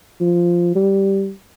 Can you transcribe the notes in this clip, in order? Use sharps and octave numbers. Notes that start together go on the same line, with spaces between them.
F3
G3